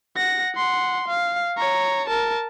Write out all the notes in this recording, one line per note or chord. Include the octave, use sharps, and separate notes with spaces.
F#5 A#6
F#5 C6
F5
C#5 A#5
A#4 A5